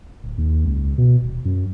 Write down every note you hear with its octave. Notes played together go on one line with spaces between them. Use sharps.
D1
D#2
C#2
B2
D#1
F#2